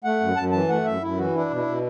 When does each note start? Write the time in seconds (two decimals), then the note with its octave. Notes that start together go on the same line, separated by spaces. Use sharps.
0.04 A3 F#5
0.20 F#2
0.36 F#2 A5
0.52 E3 A5
0.69 A3 F#5
0.85 F#2 E5
1.02 F#2 E4
1.17 E3 F#4
1.34 D4 E4
1.50 B2
1.56 E4
1.67 B2